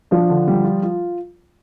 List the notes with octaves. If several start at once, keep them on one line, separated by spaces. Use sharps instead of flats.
F3 D4
D3
G3
F4
F4